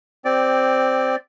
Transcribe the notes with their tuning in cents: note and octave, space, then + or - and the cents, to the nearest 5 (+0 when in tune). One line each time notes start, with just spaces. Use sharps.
C4 +0 G4 +15 D5 +0